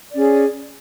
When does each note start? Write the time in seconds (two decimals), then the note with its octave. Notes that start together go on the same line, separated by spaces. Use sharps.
0.12 D5
0.14 C#4
0.17 G#4